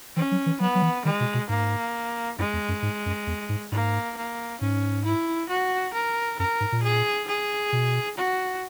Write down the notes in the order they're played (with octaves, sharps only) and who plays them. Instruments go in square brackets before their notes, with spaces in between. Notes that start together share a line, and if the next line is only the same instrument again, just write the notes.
[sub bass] E3 [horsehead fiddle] C#4
[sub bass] F#3
E3
[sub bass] F#3 [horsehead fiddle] B3
[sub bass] F#3
E3
[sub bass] D#3 [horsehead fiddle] G#3
[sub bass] B2
B2
[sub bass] G#2 [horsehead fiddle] A#3
[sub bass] F#2 [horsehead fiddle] G#3
[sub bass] E2
F#2
G#2
F#2
E2
G#2
[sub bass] G#2 [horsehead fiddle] A#3
[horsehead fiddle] A#3
[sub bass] G#2 [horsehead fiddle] C#4
[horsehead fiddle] E4
F#4
A#4
[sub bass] F#2 [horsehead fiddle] A#4
[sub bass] G#2
A#2
[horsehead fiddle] G#4
G#4
[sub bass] B2
[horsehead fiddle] F#4